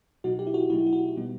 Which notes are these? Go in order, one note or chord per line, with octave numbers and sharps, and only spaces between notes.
B2 F#3 A3 D#4 F#4
G4
E4
F#4
B2 F#3 A3 D#4 E4
E4
F#4
B2 G3 B3 D#4